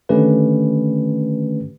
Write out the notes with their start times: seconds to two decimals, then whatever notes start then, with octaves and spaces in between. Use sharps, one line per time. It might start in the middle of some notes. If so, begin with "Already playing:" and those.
0.09 D3 D#3 A3 C#4 G4 B4